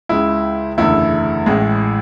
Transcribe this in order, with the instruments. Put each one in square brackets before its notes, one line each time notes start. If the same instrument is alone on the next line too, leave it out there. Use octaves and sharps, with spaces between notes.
[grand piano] C#2 C#3 G#3 E4
F#1 E2 D3 A3 E4
A1 A2 G#3